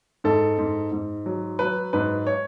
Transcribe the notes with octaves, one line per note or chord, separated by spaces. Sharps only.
G#2 A4
G#2
G#2
F#3
F#3 B4
G#2 B4
C#5